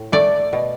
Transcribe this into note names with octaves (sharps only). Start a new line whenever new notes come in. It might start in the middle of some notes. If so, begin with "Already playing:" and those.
Already playing: A2
A3 D5
B2